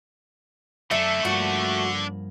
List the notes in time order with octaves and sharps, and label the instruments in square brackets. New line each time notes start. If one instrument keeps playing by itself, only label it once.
[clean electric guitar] F#2 [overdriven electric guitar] A3 [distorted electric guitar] D4 A4 [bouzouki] E5
[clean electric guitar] G2 F3 A#3 [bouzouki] F#4